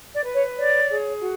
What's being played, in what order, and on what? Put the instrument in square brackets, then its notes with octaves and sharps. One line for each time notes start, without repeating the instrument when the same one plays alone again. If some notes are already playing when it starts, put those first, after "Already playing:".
[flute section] D5
B4
C#5
C#5 D5
G#4
F#4